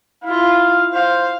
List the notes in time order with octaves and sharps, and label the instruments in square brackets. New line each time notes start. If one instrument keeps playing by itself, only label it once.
[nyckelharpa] E4 F4 [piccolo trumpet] F5
[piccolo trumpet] C5 [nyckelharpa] F5